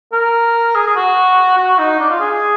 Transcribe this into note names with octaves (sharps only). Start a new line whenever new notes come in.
A#4
G#4
G#4
F#4
F#4
D#4
D4
F4
G#4
G#4